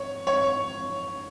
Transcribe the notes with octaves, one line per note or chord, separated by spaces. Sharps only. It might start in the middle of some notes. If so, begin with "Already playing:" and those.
Already playing: C#5
C#5